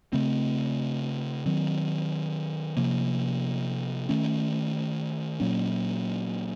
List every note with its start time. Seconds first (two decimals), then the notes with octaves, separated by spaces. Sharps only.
0.13 C#3 A3 C4
1.46 D#3 F#3 C4
2.77 C3 F3 A#3
4.09 D#3 A3 C#4
5.40 A#2 F#3 A#3 C#4